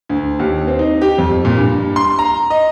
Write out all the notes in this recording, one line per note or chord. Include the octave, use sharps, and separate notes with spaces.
D2
D#2
C4
D#4
G4
F2
A#2
G2
C6
A#5
D#5